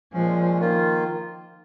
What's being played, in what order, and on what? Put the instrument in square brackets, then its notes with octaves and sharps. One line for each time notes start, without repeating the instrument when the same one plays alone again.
[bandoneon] A#2 G#3 C#4 [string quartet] F3
[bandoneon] D#3 A#3 F4